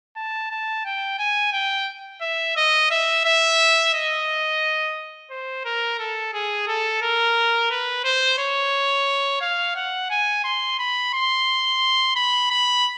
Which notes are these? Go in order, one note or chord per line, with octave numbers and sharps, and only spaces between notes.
A5
A5
G5
G#5
G5
E5
D#5
E5
E5
D#5
C5
A#4
A4
G#4
A4
A#4
B4
C5
C#5
F5
F#5
G#5
C6
B5
C6
B5
B5